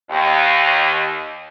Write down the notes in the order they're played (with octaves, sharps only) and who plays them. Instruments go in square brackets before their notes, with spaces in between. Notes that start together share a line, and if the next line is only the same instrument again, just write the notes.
[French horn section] D#2